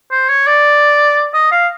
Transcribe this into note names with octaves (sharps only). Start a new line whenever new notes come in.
C5
C#5
D5
D#5
F5